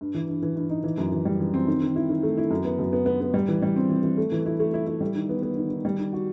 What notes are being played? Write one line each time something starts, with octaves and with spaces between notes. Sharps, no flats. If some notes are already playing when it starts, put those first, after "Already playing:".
G2
E3
G2
E3
G2
D#4
E3
F#2
E3
G3
E3
C4
D#3
D#3
E4
D#3
A3
E4
F#2
B3
F#2
B3
B3
B3
G3
E3
G3
C4
E3
E3
A3
E3
E4
A3
E4
E4
G3
D#3
B3
B3
D#3
D#3
G3
D#3
F#4